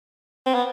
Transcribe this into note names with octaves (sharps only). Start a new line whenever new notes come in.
C4
B3